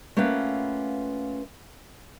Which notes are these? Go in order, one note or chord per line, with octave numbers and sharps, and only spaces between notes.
A3 A#3 C#4 F4 B4 F#5